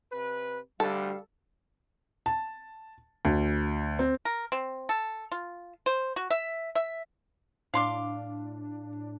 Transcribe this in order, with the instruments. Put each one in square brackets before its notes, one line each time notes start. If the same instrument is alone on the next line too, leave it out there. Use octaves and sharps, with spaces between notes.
[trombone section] C3 B4
[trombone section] D2 [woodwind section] G3 F5 [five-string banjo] A4
[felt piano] A5
D2
C4
[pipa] A#4
C4
A4
F4
C5
F#4
E5
E5
[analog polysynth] A2 D4 [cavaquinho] F5 C6 D6